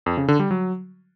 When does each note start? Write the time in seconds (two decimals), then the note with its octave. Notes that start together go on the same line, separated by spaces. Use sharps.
0.06 F2
0.17 C#3
0.28 D3
0.40 G3
0.51 F#3